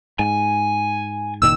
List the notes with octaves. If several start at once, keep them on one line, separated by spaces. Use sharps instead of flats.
G#2 G#5
F#1 A#2 D#3 E6